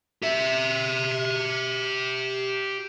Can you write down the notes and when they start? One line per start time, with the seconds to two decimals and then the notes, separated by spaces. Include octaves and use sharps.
0.22 G4 E5